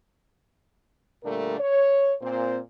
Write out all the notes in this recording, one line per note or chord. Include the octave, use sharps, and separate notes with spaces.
A#2 D3 G3 A3 D4 A#4
C#5
A#2 C4 C5